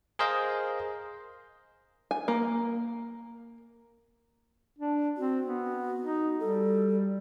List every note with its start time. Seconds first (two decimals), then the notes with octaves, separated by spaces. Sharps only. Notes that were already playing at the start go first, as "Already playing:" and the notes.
0.19 G#4 A#4 C5 D#5 F5
2.11 G#5
2.28 A#3
4.79 D4
5.17 C4 F#4
5.46 B3
6.00 D#4
6.40 G3 A4